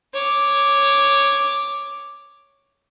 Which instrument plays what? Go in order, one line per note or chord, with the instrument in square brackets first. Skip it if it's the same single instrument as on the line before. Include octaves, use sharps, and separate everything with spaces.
[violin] C#5 D6